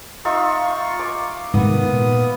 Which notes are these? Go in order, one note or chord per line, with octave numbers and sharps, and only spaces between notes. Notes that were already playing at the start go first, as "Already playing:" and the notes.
D#4 F4 E5 C#6
D6
G#2 C3 D#3 B3 D#6
A#2